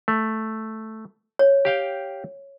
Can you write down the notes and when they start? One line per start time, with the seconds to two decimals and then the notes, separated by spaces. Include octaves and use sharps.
0.08 A3
1.39 C#5
1.65 G4 F5 G5